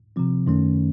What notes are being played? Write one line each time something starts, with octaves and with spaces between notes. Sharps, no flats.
C3 F3 C4
F#2 D#3 A3 C#4